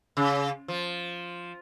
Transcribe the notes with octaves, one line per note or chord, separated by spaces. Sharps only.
C#3
F3